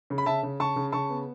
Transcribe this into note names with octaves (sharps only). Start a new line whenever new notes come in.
C#3
B5
C#3 E5 A5
C#3
C#3 A5 C#6
C#3
C#3 A5 C#6
B3